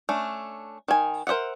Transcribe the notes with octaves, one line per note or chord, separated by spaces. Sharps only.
A3 C#4 D4
D#3 G#5
A#4 C5 D#5 E5 F#5